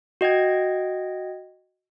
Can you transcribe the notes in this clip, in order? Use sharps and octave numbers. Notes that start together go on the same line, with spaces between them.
F#4 D#5 G5 G#6